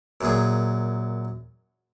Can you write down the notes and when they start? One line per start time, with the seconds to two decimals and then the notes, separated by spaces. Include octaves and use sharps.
0.21 F#2 A#2 G#4